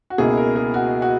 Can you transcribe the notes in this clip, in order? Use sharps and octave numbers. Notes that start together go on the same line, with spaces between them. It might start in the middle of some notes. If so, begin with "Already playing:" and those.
F#4
C#2 B2 A#3 E4 G#4
A#4
G#4
F#4
F#4